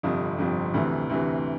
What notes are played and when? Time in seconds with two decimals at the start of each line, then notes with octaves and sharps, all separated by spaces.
0.03 G1 F2 C3 F3
0.38 G1 F2 C3 F3
0.74 D2 C3 E3
1.10 D2 C3 E3